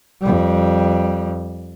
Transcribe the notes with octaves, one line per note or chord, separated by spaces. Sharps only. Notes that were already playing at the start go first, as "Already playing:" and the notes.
F2 G3